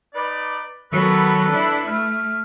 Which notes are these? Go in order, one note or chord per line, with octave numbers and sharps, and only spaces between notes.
D#4 B4 D5
D#3 F#3 B3 A4 B4
D4 E4
A3 F6